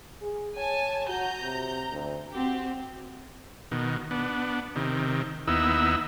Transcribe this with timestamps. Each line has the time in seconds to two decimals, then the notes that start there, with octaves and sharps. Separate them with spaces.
0.22 G#4
0.57 C#5 G#5 A5
1.08 F#4 A#5 G6
1.42 C3
1.91 D2
2.33 C4 F#4 G4
3.72 B2 D#3
4.11 B3 D4
4.76 C3 D#3
5.48 D#2 B3 D#4 E4 E6